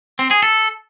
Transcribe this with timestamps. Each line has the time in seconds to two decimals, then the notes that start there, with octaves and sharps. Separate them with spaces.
0.19 C4
0.31 G#4
0.43 A4